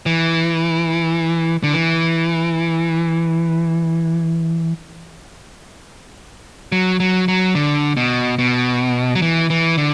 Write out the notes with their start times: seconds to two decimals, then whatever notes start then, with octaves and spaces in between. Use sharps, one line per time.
0.06 E3
1.63 D3
1.73 E3
6.72 F#3
7.00 F#3
7.28 F#3
7.55 D3
7.97 B2
8.39 B2
9.15 F#3
9.22 E3
9.50 E3
9.77 D3